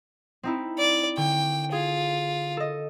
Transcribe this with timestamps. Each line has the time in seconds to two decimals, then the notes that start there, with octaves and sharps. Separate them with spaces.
0.43 C4 D#4 E4
0.78 D5
1.17 D3 G5 C#6
1.72 F4 G#4
2.57 A4 D#5